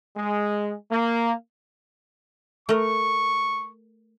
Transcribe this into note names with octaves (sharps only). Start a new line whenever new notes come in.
G#3
A#3
A3 A#4 C#6